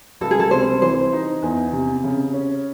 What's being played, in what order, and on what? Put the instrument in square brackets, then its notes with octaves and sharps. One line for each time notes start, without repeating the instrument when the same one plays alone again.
[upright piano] C#2 [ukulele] A4
[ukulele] G#4
A4
[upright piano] C3 [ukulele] C5
[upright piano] E3 [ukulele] C5
[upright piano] D#4
E2
C3
C#3
C#4